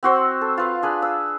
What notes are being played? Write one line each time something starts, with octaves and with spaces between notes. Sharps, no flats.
C4 F#4 C5 E6
A4
F4 B4 F5
D4 G#4 B4
E6